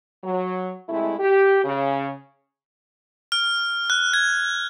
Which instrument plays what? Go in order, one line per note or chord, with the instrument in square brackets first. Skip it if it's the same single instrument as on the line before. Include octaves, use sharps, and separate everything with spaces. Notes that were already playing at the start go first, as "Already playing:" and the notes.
[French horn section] F#3
C3 G#3 A3 E4
G4
C#3
[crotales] F6
F#6
G#6